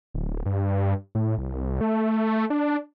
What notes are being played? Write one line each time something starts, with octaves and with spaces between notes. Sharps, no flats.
D1
G2
A2
C2
A3
D4